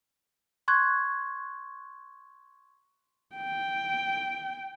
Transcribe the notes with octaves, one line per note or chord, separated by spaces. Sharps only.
C6 C#6 F#6 G#6
G5